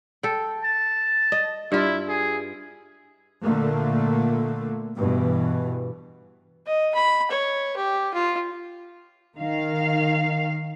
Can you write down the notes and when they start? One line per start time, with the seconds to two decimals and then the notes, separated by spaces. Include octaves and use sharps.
0.23 A4 G5
0.64 A5
1.32 D#5
1.72 G2 E4 F4
2.08 G#4
3.42 A#2 D3 A3 A#3
4.98 G2 B2 E3
6.66 D#5
6.94 B5
7.31 C#5
7.77 G4
8.14 F4
9.38 D#3 F5